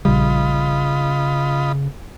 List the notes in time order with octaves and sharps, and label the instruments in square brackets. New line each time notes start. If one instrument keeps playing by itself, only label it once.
[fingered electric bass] A#1 G3 [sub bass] C#3 [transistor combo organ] F4 D#5 B5